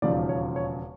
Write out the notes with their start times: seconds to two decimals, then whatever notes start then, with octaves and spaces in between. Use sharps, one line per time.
0.02 E1 D#2 C#3 F3 D5
0.29 C#5
0.56 C#5